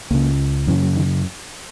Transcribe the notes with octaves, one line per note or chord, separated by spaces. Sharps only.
C#2 C#3 A#3
F#2 C#3 E3
F#3
D#3